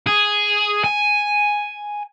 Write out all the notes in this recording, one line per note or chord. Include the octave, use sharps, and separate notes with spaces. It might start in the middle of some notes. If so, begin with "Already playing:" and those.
G#4
G#5